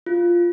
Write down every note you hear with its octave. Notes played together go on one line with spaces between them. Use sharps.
F4